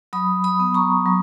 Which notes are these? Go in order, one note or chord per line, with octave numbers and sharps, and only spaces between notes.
F#3 B5 D#6
B5 D#6
B3
A#5 C#6
F#3